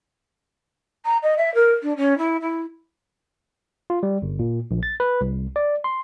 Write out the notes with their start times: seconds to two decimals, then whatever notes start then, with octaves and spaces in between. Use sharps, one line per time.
1.05 A#5
1.22 D#5
1.37 E5
1.54 A#4
1.82 D4
1.97 C#4
2.18 E4
2.41 E4
3.90 F4
4.03 G3
4.22 G1
4.39 A#2
4.71 A#1
4.83 A6
5.00 B4
5.21 C2
5.56 D5
5.84 C6